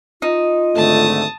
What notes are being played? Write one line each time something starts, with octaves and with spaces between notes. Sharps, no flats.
D#4 F4
G#1 D3 A3 A5 D#6